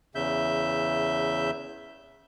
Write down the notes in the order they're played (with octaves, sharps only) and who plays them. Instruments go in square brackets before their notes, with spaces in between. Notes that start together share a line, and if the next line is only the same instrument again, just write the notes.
[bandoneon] E2 C#3 E5 G6